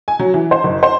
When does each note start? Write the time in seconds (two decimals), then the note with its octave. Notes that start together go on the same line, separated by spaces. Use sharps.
0.08 G#5
0.19 F#3
0.34 E3
0.51 C5
0.64 F#1
0.83 C5